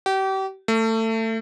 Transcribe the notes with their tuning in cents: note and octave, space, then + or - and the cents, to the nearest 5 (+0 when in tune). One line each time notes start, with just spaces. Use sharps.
G4 -35
A3 +25